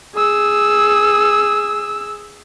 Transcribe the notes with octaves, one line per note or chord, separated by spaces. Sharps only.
G#4 E6